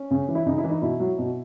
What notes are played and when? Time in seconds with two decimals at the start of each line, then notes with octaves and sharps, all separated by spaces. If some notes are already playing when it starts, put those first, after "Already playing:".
Already playing: C#4
0.11 C#3
0.28 E3
0.35 E4
0.46 C#3 D#4
0.58 E4
0.64 E3
0.70 D#4
0.82 B2 E4
1.00 F#3
1.18 B2